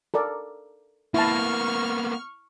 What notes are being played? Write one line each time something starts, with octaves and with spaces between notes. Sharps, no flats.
A4 A#4 D5
A#3 B3 E4 A5 C#6 F6